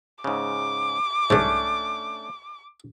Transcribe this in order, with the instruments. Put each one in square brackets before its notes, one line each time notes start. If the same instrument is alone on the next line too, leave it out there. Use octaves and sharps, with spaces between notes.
[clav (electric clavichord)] G#2 C#3 [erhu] D6
[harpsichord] C2 G#2 [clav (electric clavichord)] A3 C#4 D4